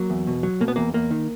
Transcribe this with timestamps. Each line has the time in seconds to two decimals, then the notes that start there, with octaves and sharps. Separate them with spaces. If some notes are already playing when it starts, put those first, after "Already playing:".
Already playing: F#3 A#3
0.10 E2
0.27 B2
0.43 F#3
0.60 B2 A#3
0.68 B3
0.76 E2 A#3
0.94 E2 A#3
1.11 D#3